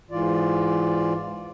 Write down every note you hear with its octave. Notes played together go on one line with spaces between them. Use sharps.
G#2 E3 F4 D5